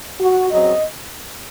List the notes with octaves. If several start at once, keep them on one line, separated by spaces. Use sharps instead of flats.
F#4
C#3 F#3 C4 D#5